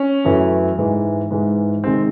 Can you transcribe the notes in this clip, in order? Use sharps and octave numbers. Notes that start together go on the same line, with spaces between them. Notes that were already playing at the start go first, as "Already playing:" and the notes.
Already playing: C#4
F#2 E3 A3
G#2 E3 G#3
G#2 E3 G#3
C3 D#3 G#3 C4